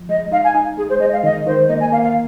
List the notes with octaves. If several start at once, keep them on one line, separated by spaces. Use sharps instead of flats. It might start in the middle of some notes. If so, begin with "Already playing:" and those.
Already playing: F3
G#3 D#5
D#4 F5
G#5
D#4
G#3 G#4
C5
G#3 D#5
F5
D#3 D#5
D#3 C5
A#3 D#5
G#5
A#3 F5
F5